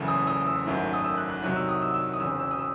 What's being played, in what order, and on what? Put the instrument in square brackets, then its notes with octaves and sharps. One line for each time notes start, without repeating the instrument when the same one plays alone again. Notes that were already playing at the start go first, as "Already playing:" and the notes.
Already playing: [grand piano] F#1 E2 C#3 E3 A3
D#6
D#6
E6
G#1 F#2 D#3 A3
D#6
E6
F#6
F#6
C2 C3 D#3 F#3 F#6
E6
D#6
E6
E6
D#6
E1 E2 C#3 E6
E6
D#6
E6